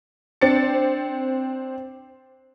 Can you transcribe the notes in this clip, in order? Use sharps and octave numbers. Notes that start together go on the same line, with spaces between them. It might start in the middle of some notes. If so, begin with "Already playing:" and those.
C4 D4 A6 C#7